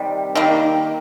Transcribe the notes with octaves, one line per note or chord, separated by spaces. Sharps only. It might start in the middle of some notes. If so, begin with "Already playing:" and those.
Already playing: C3 D#3 G3
D#3 G3 A#3